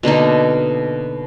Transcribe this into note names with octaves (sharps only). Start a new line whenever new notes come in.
B2 D3 A#3 D#4